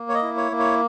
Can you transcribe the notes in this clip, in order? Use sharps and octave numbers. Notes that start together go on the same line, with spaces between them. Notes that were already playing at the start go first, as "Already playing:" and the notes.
Already playing: A#3
C#5
D#5
E4
C#5
A#3
C#5